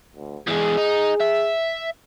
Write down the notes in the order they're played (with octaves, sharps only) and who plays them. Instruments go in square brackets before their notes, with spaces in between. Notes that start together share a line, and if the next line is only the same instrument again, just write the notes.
[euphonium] D2
[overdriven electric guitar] E2 G#3 [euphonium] G#4
[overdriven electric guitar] D#4
E5